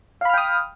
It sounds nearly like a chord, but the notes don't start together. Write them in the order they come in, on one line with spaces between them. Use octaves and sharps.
F5 B5 F6 G5 D#6